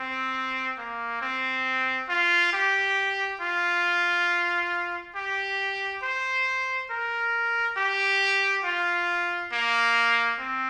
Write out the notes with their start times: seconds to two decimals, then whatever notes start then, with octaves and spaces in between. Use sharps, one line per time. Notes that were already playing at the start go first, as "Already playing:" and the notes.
Already playing: C4
0.78 A#3
1.22 C4
2.09 F4
2.53 G4
3.41 F4
5.16 G4
6.03 C5
6.91 A#4
7.77 G4
8.65 F4
9.53 A#3
10.39 C4